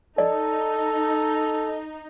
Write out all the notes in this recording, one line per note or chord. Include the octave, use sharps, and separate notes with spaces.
D#4 A4 D5 D#5